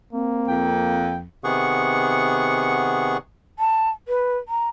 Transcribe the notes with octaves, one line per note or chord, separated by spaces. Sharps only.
A#3 C4
F2 G5
C3 D#3 B3 G#4 F#5 C#6
A5
B4
A#5